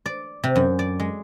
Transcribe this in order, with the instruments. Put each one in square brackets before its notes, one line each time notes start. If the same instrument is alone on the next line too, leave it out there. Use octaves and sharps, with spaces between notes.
[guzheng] D5
C3
F#2
D5
G#3